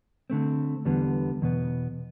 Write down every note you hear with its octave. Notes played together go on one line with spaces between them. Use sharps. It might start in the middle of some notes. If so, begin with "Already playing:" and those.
D3 A3 C4
E2 D3 G3 B3
E2 B2 B3